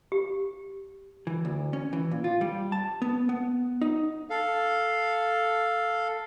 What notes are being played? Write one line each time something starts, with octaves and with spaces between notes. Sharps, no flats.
G4
E3
D2
C#4
E3
A#2
F4
G3
A5
B3
B3
D#4
A4 F5